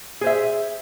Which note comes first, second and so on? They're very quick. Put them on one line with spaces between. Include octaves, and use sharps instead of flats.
G#4 C5 E5